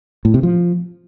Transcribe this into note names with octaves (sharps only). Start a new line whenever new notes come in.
A2
C3
F3